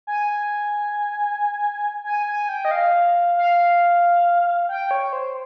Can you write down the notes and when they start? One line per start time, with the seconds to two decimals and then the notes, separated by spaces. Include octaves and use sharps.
0.07 G#5
2.05 G#5
2.27 G#5
2.49 G5
2.65 D#5
2.71 F5
3.37 F5
4.69 G5
4.91 C#5
5.13 C5